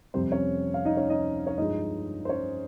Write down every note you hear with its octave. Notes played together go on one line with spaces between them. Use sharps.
F2 C3 G3 C4 C5
C#4 C#5
F5
D#4 D#5
C#4 C#5
D#4 D#5
C#5
G2 F3 G#3 D#4 D#5
C5
C#4 C#5